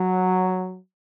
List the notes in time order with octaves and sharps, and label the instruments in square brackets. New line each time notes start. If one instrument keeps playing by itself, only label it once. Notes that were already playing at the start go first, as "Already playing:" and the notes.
Already playing: [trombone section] F#3